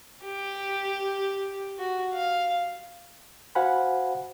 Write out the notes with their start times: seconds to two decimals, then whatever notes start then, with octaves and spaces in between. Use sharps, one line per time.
0.24 G4
1.79 F#4
2.14 F5
3.55 F#4 C5 F5 F#5 G#5 B5